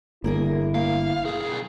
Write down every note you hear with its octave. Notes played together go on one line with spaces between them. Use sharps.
G1 A#3 E4 G#4 A#4
A#3 F5
B1 G#4